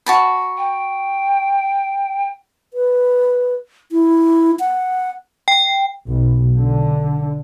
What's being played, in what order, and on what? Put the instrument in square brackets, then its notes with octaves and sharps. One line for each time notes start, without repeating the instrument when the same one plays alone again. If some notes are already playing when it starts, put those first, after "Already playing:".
[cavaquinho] F#4 A5 B5
[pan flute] G5
[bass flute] B4
E4
F#5
[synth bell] G5
[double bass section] B1
D3